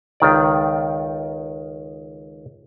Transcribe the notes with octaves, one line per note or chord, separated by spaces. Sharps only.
C#2 D#3 D5